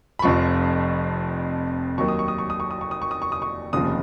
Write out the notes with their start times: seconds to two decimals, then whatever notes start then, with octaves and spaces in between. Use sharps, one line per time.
0.19 B5
0.22 F1 F2 F3 C#6
1.98 D#2 D#3 F#3 C#6
2.08 D#6
2.19 C#6
2.28 D#6
2.38 C#6
2.50 D#6
2.60 C#6
2.71 D#6
2.81 C#6
2.91 D#6
3.02 C#6
3.11 D#6
3.22 C#6
3.32 D#6
3.42 C#6
3.73 F1 D#2 C#3 F3 D#6